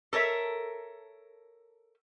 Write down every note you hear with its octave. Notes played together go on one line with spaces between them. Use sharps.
A4 A#4 C#5 E5